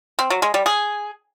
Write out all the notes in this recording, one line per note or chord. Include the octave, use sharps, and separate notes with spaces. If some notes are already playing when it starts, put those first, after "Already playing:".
C4
F#3
G#3
G3
G#4